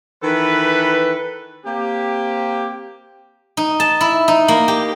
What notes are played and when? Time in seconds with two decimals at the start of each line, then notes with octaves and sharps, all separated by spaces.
0.23 D#3 E3 A4 B4
1.65 A#3 C4 G4
3.57 D#4
3.80 A5
4.01 E4
4.28 D#4
4.48 A#3
4.68 G4